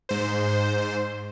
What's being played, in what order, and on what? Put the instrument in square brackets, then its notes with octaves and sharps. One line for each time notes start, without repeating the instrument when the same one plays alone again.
[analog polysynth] G#2 C5